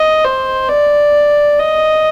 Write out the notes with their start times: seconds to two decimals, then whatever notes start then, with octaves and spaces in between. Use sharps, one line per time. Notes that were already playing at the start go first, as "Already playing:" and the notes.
Already playing: D#5
0.24 C5
0.69 D5
1.59 D#5